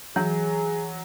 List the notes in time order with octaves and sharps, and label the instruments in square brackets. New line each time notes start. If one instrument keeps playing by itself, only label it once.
[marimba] E3 [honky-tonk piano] F#3 [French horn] G#4